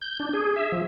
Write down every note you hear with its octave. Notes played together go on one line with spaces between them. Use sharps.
G6
D4
G#4
E5
F3